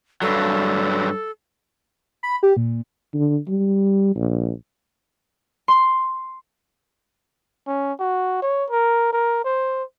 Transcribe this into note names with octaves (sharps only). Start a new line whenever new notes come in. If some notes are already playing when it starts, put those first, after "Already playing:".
G2 F#3 A4
B5
G4
A#2
D3
G3
A#1
C6
C#4
F#4
C#5
A#4
A#4
C5